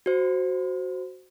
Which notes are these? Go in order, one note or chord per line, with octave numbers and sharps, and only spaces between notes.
F#4 C5